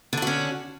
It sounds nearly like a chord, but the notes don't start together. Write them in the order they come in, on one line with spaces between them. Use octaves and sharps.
D3 D4 F#4 C#4